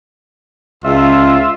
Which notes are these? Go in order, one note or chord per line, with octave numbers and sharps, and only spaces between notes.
C#2 F4 E5